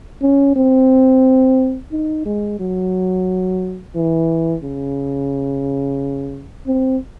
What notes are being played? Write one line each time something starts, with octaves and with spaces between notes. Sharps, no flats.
C#4
C4
D#4
G#3
F#3
E3
C#3
C4